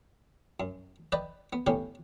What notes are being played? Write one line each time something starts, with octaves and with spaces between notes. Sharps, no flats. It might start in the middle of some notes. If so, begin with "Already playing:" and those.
F#2
B4 D5 D#5 G5
B3
A2 D3 B3 C#4 G4